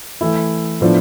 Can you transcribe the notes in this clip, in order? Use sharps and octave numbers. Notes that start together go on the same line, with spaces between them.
E3 A3 E4
A2 F3 B3 D4